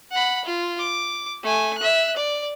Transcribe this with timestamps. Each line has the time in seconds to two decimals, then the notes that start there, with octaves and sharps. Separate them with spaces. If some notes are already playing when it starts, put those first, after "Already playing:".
0.12 F#5 B5
0.45 F4
0.79 D6
1.43 A3 G#5
1.78 E5 F#6
2.16 D5